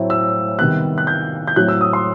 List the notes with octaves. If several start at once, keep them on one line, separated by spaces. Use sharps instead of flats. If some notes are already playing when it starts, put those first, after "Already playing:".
Already playing: A2 F#3 A3 C4 E4
E6
C3 D#3 G3 B3 F#6
F#6
G6
G6
A2 F#3 C4 E4 F#6
E6
D#6
C6